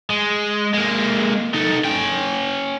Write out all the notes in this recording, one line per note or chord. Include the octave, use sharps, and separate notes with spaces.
G#3
G#3 A#3
D#4 A4
C#4 G5